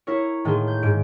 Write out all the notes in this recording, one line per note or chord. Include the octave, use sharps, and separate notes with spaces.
E4 A#4 C#5
A2 D#3 A#3 G#4 C6
G6
G#2 D7